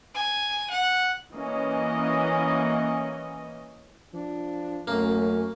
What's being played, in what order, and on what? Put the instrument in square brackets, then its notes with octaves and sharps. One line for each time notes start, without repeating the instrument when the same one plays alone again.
[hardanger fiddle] G#5
F#5
[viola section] E3 A#3 C#4 D#5
[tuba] F3 [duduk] D4
[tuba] F#2 [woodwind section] A3 [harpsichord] A#3 [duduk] C#4